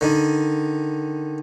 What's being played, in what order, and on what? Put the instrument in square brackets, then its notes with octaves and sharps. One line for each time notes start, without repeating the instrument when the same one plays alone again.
[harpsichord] D3 D#3